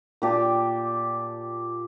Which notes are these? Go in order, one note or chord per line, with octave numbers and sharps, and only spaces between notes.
A#2 G4 A5